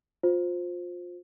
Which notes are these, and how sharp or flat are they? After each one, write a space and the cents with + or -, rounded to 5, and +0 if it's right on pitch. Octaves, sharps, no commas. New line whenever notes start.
F4 +25 C5 +0